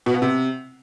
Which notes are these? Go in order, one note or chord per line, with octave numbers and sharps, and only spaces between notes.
B2
B3
C3